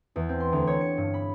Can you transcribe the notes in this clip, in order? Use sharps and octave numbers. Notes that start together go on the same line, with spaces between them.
E2
C4
C6
D2
C#5
C#7
G2
B5